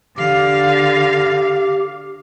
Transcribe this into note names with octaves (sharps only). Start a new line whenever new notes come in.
D3 G4 F5